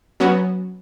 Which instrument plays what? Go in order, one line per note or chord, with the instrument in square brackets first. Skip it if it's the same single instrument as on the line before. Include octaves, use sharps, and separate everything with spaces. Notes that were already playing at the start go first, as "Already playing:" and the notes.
[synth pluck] F#3 B3 C#4 F#4